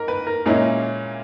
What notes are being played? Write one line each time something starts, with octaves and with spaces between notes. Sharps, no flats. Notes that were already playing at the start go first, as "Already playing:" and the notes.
Already playing: G#2 A#4
B4
A#4
A#2 G#3 C#4 E4 A#4